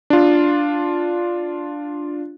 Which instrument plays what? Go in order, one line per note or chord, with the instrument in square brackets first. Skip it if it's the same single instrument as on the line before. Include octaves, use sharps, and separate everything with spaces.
[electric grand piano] D4 F4